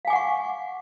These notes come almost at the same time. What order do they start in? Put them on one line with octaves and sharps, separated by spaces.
F5 G#5 D6 F#5 C#6